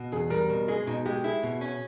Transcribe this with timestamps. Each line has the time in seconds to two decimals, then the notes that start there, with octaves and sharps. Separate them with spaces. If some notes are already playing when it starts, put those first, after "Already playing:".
Already playing: B2
0.12 E2 G#4
0.30 G3 A#4
0.49 B2 A#4
0.68 G#3 G#4
0.87 B2 D#4
1.06 G#3 G4
1.24 E4 G#4
1.43 B2
1.61 C#4